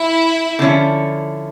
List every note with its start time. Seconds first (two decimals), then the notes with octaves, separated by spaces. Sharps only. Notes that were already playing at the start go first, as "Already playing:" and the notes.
Already playing: E4 E5
0.59 D3 F3 C#4 E4 A4